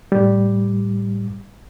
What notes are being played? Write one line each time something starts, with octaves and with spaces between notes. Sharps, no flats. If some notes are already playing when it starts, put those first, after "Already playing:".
A2 G3